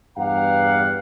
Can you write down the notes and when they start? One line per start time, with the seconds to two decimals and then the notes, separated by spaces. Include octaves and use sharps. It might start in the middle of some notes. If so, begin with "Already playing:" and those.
0.17 E2 G2 G4 F5 F#5 A#5